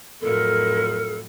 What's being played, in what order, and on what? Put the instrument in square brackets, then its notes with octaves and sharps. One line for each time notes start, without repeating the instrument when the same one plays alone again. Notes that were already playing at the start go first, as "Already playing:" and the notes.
[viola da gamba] F2 A2 F#3 [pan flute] A4 [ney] A#4